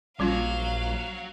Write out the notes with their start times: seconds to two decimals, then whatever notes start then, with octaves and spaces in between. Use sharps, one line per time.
0.20 A#1 F#3 G3 C#4 F4 F5